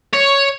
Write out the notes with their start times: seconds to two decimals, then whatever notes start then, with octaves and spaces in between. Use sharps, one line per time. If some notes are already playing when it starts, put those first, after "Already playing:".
0.13 C#5